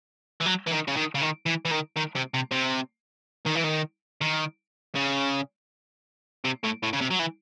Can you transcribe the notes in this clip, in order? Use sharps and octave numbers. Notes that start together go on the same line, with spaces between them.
E3
F#3
E3
D#3
C#3
D#3
C#3
D#3
E3
E3
D#3
D#3
C3
C3
C3
D#3
E3
D#3
D#3
C#3
C3
A2
A2
C#3
C3
F#3
E3